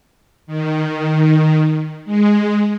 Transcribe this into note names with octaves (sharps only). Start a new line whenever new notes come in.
D#3
G#3